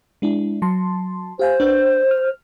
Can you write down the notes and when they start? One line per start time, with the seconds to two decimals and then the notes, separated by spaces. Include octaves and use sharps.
0.22 G#3 D4 E4
0.62 F#3 A5 C6
1.39 G4 C5 F5 G#5
1.60 D4 B4 G6
2.11 F6